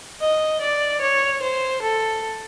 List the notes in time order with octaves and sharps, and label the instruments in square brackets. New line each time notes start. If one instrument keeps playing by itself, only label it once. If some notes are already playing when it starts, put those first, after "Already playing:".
[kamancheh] D#5
D5
C#5
C5
A4